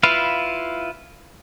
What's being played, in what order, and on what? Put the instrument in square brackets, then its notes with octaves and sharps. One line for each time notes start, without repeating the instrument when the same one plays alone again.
[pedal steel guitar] E4 F4 B4 F5